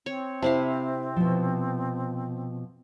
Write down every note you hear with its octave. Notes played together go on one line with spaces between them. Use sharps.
C4 C#5
C3 E4 F5 A5
B2 F3